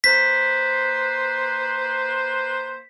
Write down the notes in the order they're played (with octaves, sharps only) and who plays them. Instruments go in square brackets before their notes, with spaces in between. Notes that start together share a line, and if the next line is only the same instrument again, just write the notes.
[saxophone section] A#3 B4 C5 [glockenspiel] B6